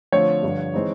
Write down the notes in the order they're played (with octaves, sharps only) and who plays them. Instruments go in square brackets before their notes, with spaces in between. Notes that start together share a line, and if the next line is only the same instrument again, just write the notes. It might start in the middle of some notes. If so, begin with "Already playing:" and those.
[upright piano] D3 F3 A3 C4 F4 [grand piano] C#5
[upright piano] G2 D3 F3
E3 G#3 C4 D#4